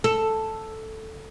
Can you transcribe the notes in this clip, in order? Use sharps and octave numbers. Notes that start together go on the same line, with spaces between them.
A4